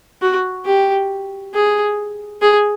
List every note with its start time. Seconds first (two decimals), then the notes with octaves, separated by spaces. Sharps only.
0.22 F#4
0.66 G4
1.54 G#4
2.41 G#4